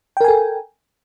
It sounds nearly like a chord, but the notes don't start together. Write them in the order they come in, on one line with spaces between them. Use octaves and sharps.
G5 A#4 G#5 A4